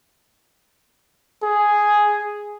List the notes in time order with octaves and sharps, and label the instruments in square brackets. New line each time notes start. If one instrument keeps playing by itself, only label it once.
[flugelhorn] G#4